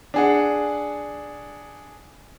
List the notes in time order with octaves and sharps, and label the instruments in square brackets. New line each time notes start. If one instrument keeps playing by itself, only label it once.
[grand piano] D4 G#4 F#5